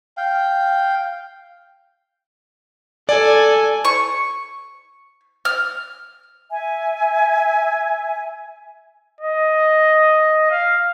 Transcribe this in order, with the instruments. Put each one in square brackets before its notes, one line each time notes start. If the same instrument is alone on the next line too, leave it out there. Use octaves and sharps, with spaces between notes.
[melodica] F5 G5
[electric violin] A4 G#5 [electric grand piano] D5
[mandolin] C#6
F6
[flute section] E5 G#5
[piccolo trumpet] D#5
F5